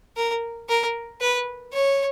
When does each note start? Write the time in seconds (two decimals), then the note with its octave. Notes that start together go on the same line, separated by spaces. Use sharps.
0.17 A#4
0.69 A#4
1.21 B4
1.73 C#5